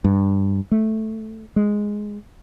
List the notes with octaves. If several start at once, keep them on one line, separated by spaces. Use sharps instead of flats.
G2
A3
G#3